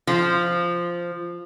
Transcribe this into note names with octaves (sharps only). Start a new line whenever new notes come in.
F3